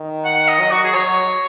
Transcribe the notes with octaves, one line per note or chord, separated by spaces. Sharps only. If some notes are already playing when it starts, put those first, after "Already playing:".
Already playing: D#3
F#5
F#5
D#5
F#3 D#5
F#4
G#4
F#3 C#5